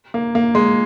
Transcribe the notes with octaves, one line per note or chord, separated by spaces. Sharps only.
A#3
A#3
G#3